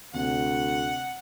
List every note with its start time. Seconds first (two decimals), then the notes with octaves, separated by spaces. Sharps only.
0.14 D2 C3 F#5